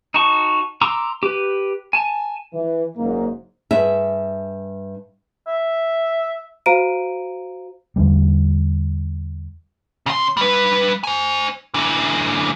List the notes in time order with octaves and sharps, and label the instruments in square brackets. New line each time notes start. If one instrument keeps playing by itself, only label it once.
[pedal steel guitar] D#4 F#4 A5 C#6
A#5 C6 D6 E6
G4 B4
G#5 A5
[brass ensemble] E3
F#1 G#2 A#3
[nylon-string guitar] G2 G#4 E5
[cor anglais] E5
[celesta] F#4 C5 F5 A#5 D7 D#7
[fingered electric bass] E2 D3 G3
[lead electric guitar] C#3 C6
G3 B4
C5 G#5
D3 E3